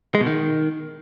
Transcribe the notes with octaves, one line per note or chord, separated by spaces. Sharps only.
G#3
B2
D#3